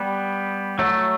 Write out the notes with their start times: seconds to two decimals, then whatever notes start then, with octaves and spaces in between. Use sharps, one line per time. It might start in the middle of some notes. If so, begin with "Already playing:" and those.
Already playing: G3 B3
0.79 F#3 A3